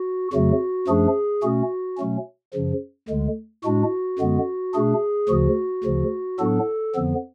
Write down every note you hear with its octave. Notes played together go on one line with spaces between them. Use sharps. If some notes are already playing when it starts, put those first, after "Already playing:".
Already playing: F#4
F2 C#3 F#3 A3 F#4
F#2 F3 A3 D4 G#4
B2 A3 C#4 F#4
B2 F#3 A3 C#4
F#2 C#3 F3
D2 D3 G#3
A2 G#3 D4 F#4
F#2 D3 G#3 B3
B2 A3 D4 G#4
D2 C#3 F3 F#4
D2 C#3 F3
A2 F#3 B3 D4 A4
F2 D3 F3 B3